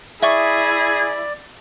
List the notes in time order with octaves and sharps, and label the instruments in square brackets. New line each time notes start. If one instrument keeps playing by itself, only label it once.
[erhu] E4 [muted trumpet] G#4 [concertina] D5 [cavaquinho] E5 C#6 D#6